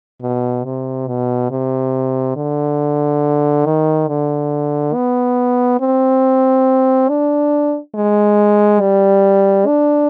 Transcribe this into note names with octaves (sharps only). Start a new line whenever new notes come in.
B2
C3
B2
C3
D3
D#3
D3
B3
C4
D4
G#3
G3
D4